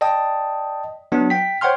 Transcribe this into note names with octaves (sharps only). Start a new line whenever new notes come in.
D5 D#5 G5 A5 D#6
F#3 B3 D4
G5 B6
C5 C#5 F#5 G5 C6 F6